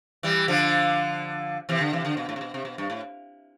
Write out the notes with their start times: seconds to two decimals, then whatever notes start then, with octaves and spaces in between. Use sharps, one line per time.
0.23 E3 G3
0.48 D3 F3
1.69 C3 E3
1.81 D3
1.93 C3 E3
2.05 D3
2.17 B2
2.29 A2
2.36 C3
2.41 B2
2.54 C3
2.65 B2
2.78 G2
2.90 A2